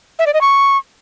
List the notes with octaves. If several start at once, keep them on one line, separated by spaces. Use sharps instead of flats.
E5
D5
D#5
C#6